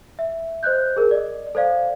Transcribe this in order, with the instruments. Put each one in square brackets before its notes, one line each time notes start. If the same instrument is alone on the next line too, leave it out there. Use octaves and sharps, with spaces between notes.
[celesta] E5
C5 D#5 F#6 G6
G#4 A#4
D5 D#5
A4 C5 D5 F5